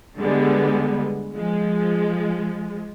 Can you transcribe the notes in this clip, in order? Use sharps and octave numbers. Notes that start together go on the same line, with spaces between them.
D3 G3 G#3 B3
F3 G#3